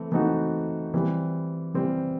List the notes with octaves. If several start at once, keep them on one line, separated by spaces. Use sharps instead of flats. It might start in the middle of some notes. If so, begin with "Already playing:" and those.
Already playing: E3 A3 C4
E3 A3 C4 D#4 F#4
E3 G3 C4
E3 G3 C4